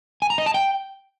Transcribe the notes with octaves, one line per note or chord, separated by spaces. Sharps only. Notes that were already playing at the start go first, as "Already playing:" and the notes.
G#5
A#5
D#5
A5
G5